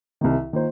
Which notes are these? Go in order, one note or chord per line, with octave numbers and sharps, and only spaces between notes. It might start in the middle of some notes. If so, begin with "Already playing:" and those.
C2 C3 D#3
D#3 A#3 F4 C5